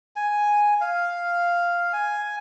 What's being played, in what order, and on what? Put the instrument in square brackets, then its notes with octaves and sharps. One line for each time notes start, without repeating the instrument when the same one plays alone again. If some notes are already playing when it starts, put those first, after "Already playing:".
[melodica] G#5
F5
G#5